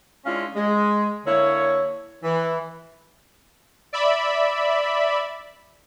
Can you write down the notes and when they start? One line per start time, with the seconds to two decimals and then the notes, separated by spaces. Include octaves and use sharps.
0.25 G#3 C#4 D4 E4 F4 F5
0.55 G#3
1.26 D3 A#3 E4 C#5
2.24 E3
3.93 D5 E5 B5